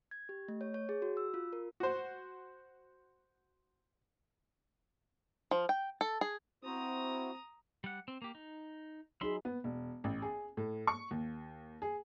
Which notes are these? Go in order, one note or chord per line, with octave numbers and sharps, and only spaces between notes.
G#6
G4
A3
C#5
C#5
G#4
F#4
E6
F4
A#4
F#4 C5
F3
G5
A4
G#4
C4 E4 F#4 C5 A#5 D#6
G3 F#5
C4
A#3 G4
D#4
F#3 D#4 G#4 E5 B5 C6
B3
E1
A1
G#4
A2
C#6
D#2
G#4